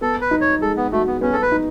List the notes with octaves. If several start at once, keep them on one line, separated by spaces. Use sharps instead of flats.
B3 A4
B4
D#4
C#5
G#3 A4
B3
A3 F#4
B3
B3 C#4
A4
B4
D#4